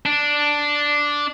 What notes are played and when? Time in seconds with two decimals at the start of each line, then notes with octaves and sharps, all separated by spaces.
0.06 D4